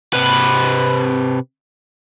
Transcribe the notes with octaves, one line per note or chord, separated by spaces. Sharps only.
C3 B4